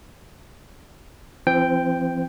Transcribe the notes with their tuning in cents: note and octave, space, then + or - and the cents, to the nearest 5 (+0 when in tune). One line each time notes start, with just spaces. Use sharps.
F3 -45 C4 +0 G5 +0